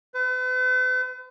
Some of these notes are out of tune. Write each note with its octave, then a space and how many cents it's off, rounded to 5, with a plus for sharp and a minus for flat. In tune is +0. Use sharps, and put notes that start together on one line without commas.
B4 +45